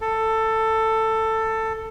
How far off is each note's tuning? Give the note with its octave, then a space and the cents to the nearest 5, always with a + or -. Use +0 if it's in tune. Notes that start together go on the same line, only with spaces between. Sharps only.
A4 +15